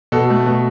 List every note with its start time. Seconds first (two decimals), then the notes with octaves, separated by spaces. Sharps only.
0.12 B2 A4
0.30 A3
0.46 B2